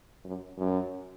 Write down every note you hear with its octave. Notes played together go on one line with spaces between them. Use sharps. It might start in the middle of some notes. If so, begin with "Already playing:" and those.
F#2
F#2